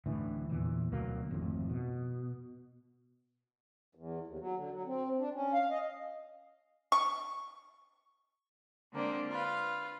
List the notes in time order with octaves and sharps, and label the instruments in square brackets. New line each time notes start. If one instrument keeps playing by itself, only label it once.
[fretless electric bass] D1 A2 D3 E3
E2 A#2 E3
D2 B2 F#3 A#3
G#1 F2 A2
B2
[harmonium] E2
D#2
F#3
D3
F#3
C4
D4
C#4
F5
D#5
[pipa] C#6
[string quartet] D3 G#3 A#3 C4 D4
F4 B4 F5